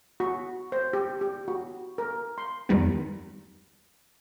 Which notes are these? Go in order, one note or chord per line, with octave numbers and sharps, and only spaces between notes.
F#4
C5
G4
G4
F#4
A#4
C6
F2 D#3 G3 B3